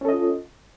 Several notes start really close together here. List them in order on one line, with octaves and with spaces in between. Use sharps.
C#4 A4 D#5 F4